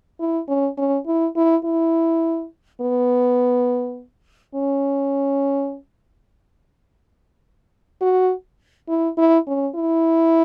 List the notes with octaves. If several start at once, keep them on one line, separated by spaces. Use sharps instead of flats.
E4
C#4
C#4
E4
E4
E4
B3
C#4
F#4
E4
E4
C#4
E4